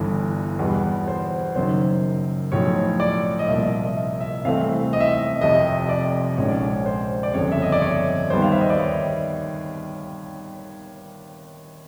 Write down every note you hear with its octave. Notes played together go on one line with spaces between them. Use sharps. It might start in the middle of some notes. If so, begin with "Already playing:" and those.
Already playing: G1 G2 E3
E2 B2 G3 B3
C5
F#1 F#2 D#3 C5
B1 A2 F3 C#5
D5
D#5
C2 A#2 F3 A#3 E5
D#5
E5
E5
C2 C3 E3 A3 C4 F5
D#5
E5
D#5
F1 F2 C3 D#5
D5
A#1 G#2 F3 G#3 C#4 C#5
D5
C#5
C5
D5
G1 F2 C#3 C#5
E5
D#5
D5
C#5
D#2 D#3 G3 B3 C5
F5
E5
D#5
D5
C#5